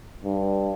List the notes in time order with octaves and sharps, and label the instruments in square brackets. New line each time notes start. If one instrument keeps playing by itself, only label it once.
[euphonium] G2